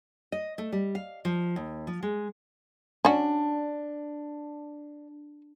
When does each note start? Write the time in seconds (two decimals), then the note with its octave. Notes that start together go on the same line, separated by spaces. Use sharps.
0.32 D#5
0.58 A3
0.72 G3
0.95 F5
1.25 F3
1.56 D#2
1.87 F3
2.03 G#3
3.05 C#4 D4 F#4